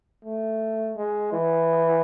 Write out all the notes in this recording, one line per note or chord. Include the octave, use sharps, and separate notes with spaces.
A3
G#3
E3